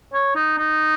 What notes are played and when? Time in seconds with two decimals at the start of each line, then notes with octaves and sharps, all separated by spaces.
0.14 C#5
0.35 D#4
0.58 D#4